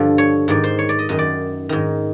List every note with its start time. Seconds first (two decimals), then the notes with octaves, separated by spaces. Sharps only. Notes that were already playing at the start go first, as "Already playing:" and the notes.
Already playing: G2 D3 F3
0.18 C#5
0.48 G#2 D#3 D5
0.64 C5
0.79 C#5
0.89 D5
0.99 D#5
1.09 F#2 D#3 D#5
1.19 D5
1.69 G#2 D#3